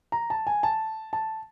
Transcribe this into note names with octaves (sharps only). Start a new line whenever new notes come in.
A#5
A5
G#5
A5
A5